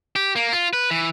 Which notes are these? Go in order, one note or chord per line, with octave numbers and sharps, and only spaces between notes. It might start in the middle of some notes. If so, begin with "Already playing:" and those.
G4
A#3
F4
B4
E3